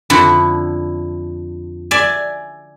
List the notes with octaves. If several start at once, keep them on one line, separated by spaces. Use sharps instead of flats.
F2 D3 E4 F#5
D5 E5 G#5